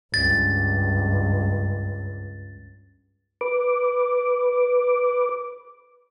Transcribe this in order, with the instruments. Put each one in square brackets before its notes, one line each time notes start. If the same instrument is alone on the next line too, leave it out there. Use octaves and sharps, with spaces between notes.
[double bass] C#2 G2 [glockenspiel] A6
[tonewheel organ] B4 D6